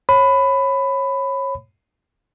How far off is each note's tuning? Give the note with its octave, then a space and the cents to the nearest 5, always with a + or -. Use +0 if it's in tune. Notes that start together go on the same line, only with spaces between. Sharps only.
C#5 -25 B5 +15